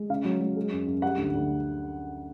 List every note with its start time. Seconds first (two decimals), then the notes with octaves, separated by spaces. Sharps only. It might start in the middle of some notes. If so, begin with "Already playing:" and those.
Already playing: G#3
0.10 C#3 F5
0.25 F#3
0.41 F#3
0.56 G#3
0.72 F#2
0.87 F#2
1.02 G3 F#5
1.18 D2
1.34 D2